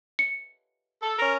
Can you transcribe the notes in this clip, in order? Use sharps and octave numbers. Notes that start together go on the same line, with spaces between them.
C#7
A4
C#4 A#4